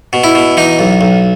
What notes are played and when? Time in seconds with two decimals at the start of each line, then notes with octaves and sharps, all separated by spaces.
0.13 B2
0.24 E4
0.35 B2
0.57 E3 D#4
0.79 B1
1.01 B1